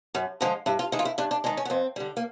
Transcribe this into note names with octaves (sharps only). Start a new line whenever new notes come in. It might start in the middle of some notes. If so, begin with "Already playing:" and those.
F#2
D3 F3 G#3
G2 E4
F4
D#3 G#3 E4
F4
E4
G2 D4
D4
D#3 G#3 D4
C#4
B3
F2 C4
D3 G3
A#3